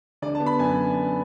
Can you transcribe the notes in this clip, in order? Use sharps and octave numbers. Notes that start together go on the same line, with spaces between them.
D3 D5
A5
B3
B5
F#2 G#5